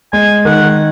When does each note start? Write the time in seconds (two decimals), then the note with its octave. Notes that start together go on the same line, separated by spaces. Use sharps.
0.13 G#3 G#5
0.45 D#3 F#5